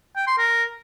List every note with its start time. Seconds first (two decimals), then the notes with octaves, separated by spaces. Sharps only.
0.16 G5
0.27 C6
0.38 A#4